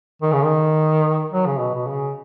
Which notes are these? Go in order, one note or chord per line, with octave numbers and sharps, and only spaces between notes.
D#3
C#3
D#3
F#3
C#3
B2
B2
C#3